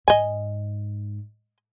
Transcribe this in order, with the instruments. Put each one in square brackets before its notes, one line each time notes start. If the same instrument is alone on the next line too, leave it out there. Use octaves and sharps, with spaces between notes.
[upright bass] G#2 [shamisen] D#5 G#5